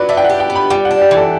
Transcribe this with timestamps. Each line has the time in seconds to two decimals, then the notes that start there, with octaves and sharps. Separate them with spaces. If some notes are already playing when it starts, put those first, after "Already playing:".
Already playing: F#3 F#4 B4 D5
0.09 D4 E5
0.17 G5
0.24 F#5
0.30 G4
0.40 G5
0.50 B3
0.56 B5
0.70 G3 G5
0.85 F#5
0.91 D4
1.02 G4
1.11 E3
1.17 A4